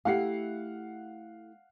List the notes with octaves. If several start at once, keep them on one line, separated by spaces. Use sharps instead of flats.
A3 E4 G4 F5 F#5 C7